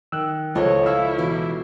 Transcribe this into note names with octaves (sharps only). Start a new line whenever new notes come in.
D#3 E6 F#6
C#2 F3 A4 C#5 D#5
E4 C#5 F5 B5 E6
B2 E3 D6